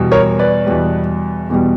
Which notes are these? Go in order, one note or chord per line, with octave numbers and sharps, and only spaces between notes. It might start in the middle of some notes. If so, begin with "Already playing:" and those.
Already playing: E2 B2 G3
A#4 C#5
B4 D5
E2 B2 G3
E2 B2 G3